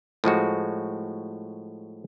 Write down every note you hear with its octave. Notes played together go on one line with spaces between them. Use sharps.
A2 F3 G#3 F#4